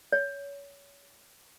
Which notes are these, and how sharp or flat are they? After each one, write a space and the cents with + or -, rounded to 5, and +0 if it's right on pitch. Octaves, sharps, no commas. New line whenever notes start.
C#5 +25